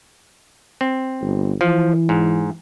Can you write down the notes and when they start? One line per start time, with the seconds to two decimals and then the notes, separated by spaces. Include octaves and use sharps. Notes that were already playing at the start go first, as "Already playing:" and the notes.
0.81 C4
1.22 G1
1.61 E3 F3
2.09 G#2